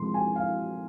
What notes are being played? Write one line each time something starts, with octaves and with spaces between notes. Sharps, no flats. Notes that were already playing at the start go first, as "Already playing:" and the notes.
Already playing: C3 F3 G#3 C6
G#5
F5